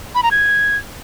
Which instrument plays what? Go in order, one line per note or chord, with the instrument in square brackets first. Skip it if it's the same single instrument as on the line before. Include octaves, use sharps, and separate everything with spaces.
[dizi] B5
A#5
G#6